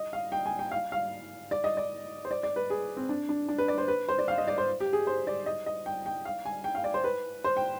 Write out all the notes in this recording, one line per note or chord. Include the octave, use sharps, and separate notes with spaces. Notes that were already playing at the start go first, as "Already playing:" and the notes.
Already playing: D#5
F5
G5
G#5
G5
F5
F5
D5
D#5
D5
C5
D5
D5
B4
G#4
C4
D4
D4
D4
B4
D5
C5
B4
C5
D5
F5
D#5
D5
C5
G4
G#4
C5
D5
D#5
D#5
G5
G5
F5
G#5
G5
F5
D5
C5
B4
C5
G5